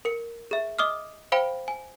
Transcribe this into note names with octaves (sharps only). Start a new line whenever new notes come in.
A#4 C#7
G#4 E5
D#5 D6 D#6 F6
C5 F5 G5 B5 D7
G#5